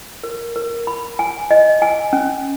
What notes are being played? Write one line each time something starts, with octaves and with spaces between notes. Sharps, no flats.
A#4
A#4
B5
G#5
D#5
G#5
C#4